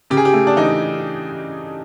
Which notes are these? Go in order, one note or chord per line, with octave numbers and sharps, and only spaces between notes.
C#3 G4
G#4
G4
A3
D4
E3 D#4